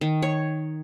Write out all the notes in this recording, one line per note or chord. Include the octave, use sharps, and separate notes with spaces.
D#3
C#5